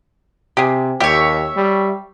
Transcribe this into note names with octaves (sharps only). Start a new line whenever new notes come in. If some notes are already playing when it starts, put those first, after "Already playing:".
C3 G4 G#4
D#2 G4 C#5 E5
G3